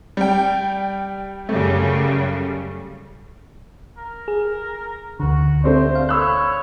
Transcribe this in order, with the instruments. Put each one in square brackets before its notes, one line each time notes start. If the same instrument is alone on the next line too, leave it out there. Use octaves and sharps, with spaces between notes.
[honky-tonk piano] G3 G5
[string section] F#2 C#3 G3 [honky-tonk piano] A3
[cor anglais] A#4
[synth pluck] G#4
[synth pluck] D2 D3 [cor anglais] F#4
[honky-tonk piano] A3 C4 D4 [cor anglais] C5
[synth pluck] F5
[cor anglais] C#5 [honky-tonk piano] B5 E6 F#6